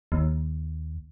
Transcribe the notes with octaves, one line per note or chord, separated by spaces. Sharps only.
D#2